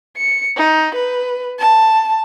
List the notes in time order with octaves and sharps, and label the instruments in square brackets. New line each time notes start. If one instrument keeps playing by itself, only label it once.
[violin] C#7
D#4
B4
A5